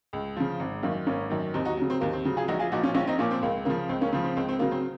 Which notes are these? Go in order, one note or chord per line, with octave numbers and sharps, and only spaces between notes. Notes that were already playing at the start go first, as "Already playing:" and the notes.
C#2
C#3 F3
G#1
F#2 D#3 A#3 C#4
G#1 A#3 C#4
F#2 D#3
D#2 C4 D#4
D#4 F#4
C#3 F#3
C4
D#2 A#3
C4
C#3 F#3
F4 G#4
A#1 D#4 F#4
F4 G#4
A#2 F3 D#4 F#4
C#4 F4
A#1 C#4 F4
C4 D#4
A#2 F3 A#3 C#4
C4
C#2 A#3
C#3 F3 A#3
C#2 C4
A#3 C#4
C#3 F3 C4
C4
C#2 C4
C4
C#3 F#3 A#3
C4